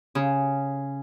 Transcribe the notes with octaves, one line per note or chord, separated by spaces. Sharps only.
C#3